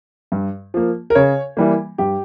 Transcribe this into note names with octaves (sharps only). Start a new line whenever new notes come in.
G2
F3 A#3
A#4
C#3 C#5
E3 G3 A#3
G2 G4